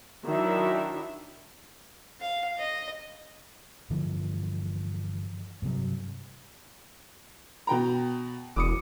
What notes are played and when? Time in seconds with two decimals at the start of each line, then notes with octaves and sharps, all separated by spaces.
0.25 D#3 F#3 D4 E4 E5
2.21 F5
2.58 D#5
3.90 G2 D3 E3 F3
5.62 G2 C3 F#3
7.67 B2 G5 A#5
8.56 E1 D6 D#6 C#7